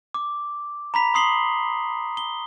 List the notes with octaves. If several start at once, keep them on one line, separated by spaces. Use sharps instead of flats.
D6
A#5 B5 B6 F7
C6 D#6 C7 F#7 G7
G7